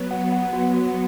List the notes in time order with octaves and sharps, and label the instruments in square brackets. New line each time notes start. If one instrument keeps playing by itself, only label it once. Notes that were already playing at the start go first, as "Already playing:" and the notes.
Already playing: [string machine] F#3 B3
[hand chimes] F#5
F#5
F#4
F#4